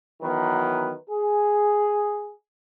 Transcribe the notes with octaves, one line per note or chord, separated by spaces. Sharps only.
D#3 E3 F#3 B3 B4
G#4